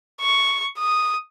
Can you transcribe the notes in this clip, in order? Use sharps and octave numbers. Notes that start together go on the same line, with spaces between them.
C#6
D#6